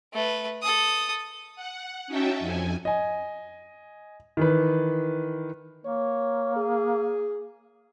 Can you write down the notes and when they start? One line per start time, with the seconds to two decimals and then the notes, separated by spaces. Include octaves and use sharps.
0.14 A3 B4
0.63 A4 D#6
1.56 F#5
2.07 C#4 D#4 F#4 E5 G5 A5
2.40 F2 G#5
2.85 D#5 G#5
4.37 D#3 E3 B4
5.85 A#3 C#5
6.56 G#4